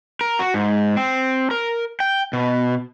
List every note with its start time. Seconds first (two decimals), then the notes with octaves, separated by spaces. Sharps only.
0.21 A#4
0.39 F#4
0.54 G#2
0.97 C4
1.51 A#4
2.00 G5
2.33 B2